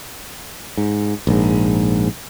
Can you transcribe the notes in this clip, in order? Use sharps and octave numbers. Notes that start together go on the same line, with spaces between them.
G#2
A#1 G#2